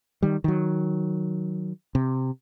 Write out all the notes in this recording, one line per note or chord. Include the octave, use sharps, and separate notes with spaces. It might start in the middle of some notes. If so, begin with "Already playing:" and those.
D#3 G3
D#3 F#3
C3